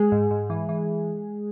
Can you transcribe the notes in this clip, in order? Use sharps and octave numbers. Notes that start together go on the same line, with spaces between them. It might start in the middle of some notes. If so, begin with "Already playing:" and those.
Already playing: G#3 G#4
G#2
G#2
E3
E3